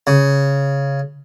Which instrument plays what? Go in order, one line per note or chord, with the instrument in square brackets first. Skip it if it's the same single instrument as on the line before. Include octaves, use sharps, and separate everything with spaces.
[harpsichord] C#3